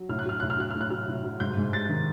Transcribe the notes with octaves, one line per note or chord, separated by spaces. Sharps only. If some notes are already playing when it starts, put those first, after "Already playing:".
Already playing: F#3
A2 F6
F#6
F#3 F6
A2 F#6
F6
F#3 F#6
A2 F6
F#6
F#3 F6
A2
F#3
G#2 G6
G#2
G3 A6
D#3